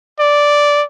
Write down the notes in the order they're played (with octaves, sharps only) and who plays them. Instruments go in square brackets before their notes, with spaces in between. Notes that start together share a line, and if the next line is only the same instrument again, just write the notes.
[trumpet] D5